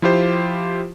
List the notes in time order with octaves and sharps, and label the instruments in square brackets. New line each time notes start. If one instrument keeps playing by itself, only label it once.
[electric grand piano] F3 E4 F4 G4 C5